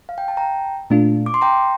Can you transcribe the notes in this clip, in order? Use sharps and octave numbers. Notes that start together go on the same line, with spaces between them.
F5
G5
A5
G5 A#5
A#2 A3 D4 F4
D6
C6
G5 A#5